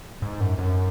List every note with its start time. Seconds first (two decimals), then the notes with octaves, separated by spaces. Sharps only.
0.22 G#2
0.41 F#2
0.59 F#2